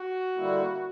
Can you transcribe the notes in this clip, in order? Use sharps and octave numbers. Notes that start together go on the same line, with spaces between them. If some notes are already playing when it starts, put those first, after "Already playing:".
Already playing: F#4
D3 G3 A#3 E4